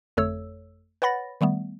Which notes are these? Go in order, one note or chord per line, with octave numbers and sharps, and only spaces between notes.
G1 F2 A3 A4 C#5 E6
B4 C#5 F#5 B5 A6 A#6
D#3 G3 A3 B3